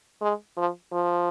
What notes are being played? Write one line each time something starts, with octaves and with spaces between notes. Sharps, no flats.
G#3
F3
F3